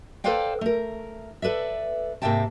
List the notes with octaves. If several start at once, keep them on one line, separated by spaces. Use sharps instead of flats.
A4 B4 C5 D5 F5 G5
A3 A#4
A4 B4 D5 E5
G#2 C3 A#3 E5 G5 A5